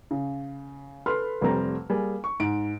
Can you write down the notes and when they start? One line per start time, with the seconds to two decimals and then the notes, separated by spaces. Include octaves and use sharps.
0.11 C#3
1.06 A4 B4 B5 C6 F6
1.41 F1 G3 A3 C4 A#5
1.90 G3 A#3 G#4 G#5
2.24 C#6
2.40 G#2 D7